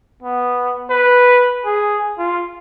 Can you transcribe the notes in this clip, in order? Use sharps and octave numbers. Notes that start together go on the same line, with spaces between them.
B3
B4
G#4
F4